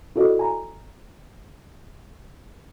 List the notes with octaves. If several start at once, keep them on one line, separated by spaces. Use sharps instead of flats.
E4 F#4 A4 D5 D#5
G#5 A#5